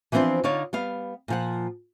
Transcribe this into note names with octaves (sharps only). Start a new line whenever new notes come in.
E3 F3 B3 C4 D4 C5
D3 D#4 F4 C#5 D5 F5
G3 B3 F5
A#2 F3 F#5